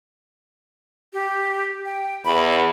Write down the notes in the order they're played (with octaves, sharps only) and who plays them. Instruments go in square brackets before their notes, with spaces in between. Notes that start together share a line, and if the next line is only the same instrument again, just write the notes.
[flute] G4
G5
[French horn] E2 [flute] B5